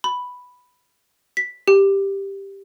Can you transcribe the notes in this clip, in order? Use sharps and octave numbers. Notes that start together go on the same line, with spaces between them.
B5
B6
G4